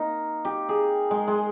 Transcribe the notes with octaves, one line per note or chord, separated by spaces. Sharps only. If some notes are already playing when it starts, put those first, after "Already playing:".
Already playing: A#3 D#4
G4
G#4
G#3
G#3